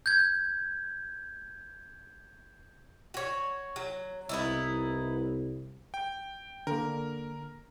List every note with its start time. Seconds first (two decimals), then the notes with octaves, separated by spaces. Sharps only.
0.06 G6 G#6
3.14 F#4 C#5
3.76 F#3
4.29 C2 B3 D#4 E4
5.94 G5
6.67 D3 A#3 A#4